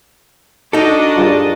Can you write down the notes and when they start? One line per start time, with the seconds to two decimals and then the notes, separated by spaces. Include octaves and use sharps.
0.73 D4 D#4 F#4 A4 D#5
1.18 G2 F4 G#4 D5